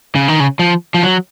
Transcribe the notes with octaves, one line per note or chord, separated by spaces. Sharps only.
C#3
D#3
C#3
F3
F3
F#3